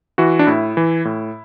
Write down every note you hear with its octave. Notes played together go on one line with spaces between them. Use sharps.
E3 F#4
D4
A2 E4
E3
A2